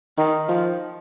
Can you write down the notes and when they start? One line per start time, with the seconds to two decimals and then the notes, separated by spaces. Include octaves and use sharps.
0.18 D#3
0.49 F3